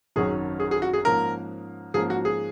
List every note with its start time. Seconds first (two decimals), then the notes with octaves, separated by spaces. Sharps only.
0.16 G#1 F#2 D#3 F#3 C#4 G#4
0.60 G#4
0.71 G#4
0.82 F#4
0.93 G#4
1.05 G#2 F3 A#3 C#4 A#4
1.94 G#2 F3 A#3 C#4 G#4
2.10 F#4
2.25 G#4